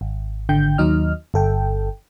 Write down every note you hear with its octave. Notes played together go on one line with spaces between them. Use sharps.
G#1
G#1 D3 G5 G6
D#2 F#3 D#4 D#5 F6
G1 A4 G5